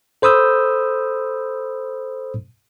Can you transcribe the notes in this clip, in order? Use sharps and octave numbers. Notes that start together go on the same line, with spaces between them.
A4 C5 B5 D#6 E6 G6